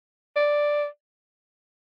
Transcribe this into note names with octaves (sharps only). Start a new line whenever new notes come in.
D5